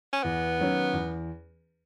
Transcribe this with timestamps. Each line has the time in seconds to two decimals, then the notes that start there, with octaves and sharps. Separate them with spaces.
0.13 C#4
0.24 E2 B3
0.59 D#3 F#3 C#4
0.93 E2